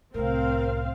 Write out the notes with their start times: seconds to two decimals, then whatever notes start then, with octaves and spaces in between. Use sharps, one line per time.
0.14 C2 A2 C4 A#4 F5